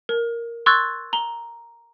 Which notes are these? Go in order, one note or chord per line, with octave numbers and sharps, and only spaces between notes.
A#4
C6 C#6 E6 F#6 G#6 A6
A#5 G7